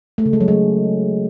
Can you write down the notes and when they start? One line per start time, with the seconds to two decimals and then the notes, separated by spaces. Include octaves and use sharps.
0.18 A3
0.26 C#3
0.33 G#3
0.40 F#3
0.48 G#3